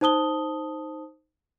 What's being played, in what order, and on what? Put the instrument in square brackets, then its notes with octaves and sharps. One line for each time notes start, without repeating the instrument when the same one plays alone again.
[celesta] D#4 C5 A5 D#6 G7